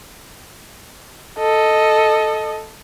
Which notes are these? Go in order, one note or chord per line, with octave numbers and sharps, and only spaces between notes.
A4 D#5